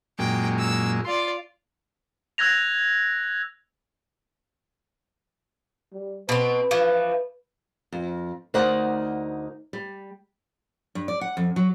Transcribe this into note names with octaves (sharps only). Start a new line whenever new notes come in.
F#2 A#2 G#3 G5
E6
F4 D5 C6
E6 F#6 G#6 A#6 F7
G3
B2 C4 B4
E3 F3
F2
D2 D#4 A#4 C5 D5 F#5
G3
G2
D5
F#5
F2
F#3